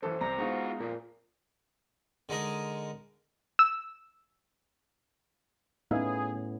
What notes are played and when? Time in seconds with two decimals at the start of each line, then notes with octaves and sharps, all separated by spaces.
0.03 B1 F#2 E3 A4 C5
0.21 C2 C3 A#5
0.38 G#3 B3 D#4 F4 F#4
0.80 F2 A#2 F3
2.29 D3 G#3 D#4 A#4
3.59 E6
5.91 A2 B3 C#4 D#4 G#4 E5 F5